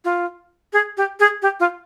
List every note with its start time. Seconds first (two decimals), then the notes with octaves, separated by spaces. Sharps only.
0.05 F4
0.73 G#4
0.97 G4
1.20 G#4
1.42 G4
1.60 F4